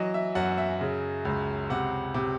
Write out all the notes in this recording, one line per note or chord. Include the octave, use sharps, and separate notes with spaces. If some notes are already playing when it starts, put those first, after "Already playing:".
Already playing: E3 F#3 D#5
E5
F#2 F#5
E5
C#3
C#2
C3 F#5
C3